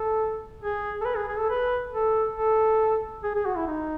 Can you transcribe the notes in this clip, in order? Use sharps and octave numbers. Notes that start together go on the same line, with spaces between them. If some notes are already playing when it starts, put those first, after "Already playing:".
Already playing: A4
G#4
A4
B4
G#4
G#4
A4
B4
A4
A4
G#4
G#4
F#4
E4
D#4